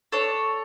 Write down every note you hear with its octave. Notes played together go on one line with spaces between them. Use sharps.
D4 A4 C#5